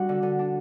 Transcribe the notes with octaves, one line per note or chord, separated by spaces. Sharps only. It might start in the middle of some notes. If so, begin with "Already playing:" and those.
Already playing: G3 D4 F#4
D3
D3
D4